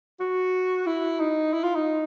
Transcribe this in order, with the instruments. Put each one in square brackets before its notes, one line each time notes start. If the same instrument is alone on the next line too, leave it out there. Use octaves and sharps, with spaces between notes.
[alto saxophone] F#4
E4
D#4
E4
F4
D#4